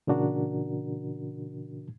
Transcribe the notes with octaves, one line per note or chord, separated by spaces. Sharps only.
A#2 C#3 E3 D4 F#4 A#4